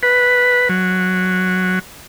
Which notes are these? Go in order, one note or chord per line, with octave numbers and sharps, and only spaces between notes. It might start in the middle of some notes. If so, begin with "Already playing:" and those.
B4
F#3